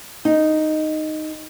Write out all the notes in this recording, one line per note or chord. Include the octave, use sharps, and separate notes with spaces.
D#4